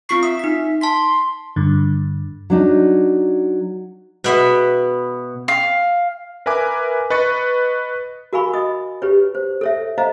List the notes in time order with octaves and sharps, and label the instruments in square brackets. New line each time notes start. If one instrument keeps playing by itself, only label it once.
[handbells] C4 F4 C7 [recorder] C#6
[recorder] E5 [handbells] D#6
[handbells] D#4 B6
[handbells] A5 B6 [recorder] C6
[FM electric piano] G2 D3
[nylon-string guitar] F#3 D4 D#4
[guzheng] B2 B3 E5
[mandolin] F5
[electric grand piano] A#4 B4 E5 G#5 D6
B4 D#5 C#6 A6 C#7
[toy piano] F#4 A#4 F5 G#5 B5 C#6
D#5 D#6
G4 B4 C#5
C5
A4 C#5 E5
C5 D#5 F5 A#5